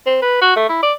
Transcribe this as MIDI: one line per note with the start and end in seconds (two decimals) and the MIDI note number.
0.06 0.17 60
0.22 0.41 71
0.42 0.53 66
0.56 0.69 57
0.69 0.82 64
0.83 0.93 74